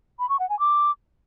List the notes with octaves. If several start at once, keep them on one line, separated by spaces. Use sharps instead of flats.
B5
C#6
F#5
G#5
D6